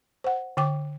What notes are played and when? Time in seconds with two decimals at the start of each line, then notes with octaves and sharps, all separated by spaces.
0.24 C5 F#5
0.57 D3 G5 D6